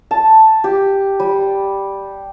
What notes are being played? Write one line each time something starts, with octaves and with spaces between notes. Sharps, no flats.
A5
G4
G3